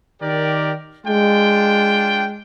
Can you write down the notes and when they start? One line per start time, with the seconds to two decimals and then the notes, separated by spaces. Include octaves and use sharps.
0.22 D#3 G4 A#4 D5
1.07 G#3 D4 F4 G5